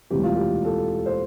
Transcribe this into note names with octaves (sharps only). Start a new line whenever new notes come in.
E1 D2 C3 E3 G3 G4
F4
G4
A4
C5